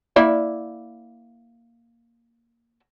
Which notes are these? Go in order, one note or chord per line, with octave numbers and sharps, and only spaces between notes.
A#3 E4 D5